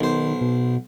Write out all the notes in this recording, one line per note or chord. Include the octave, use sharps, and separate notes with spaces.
B1 D#3 C5
B2